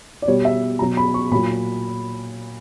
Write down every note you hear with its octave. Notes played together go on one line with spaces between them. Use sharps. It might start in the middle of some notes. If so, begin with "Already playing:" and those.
D5
B2 G3 C#5
E5
B2 F#3 A#5
B5
C#6
A#2 F#3 B5